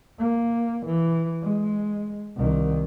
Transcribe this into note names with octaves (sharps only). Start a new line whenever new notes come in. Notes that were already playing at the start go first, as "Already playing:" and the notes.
A#3
E3
G#3
C2 D#3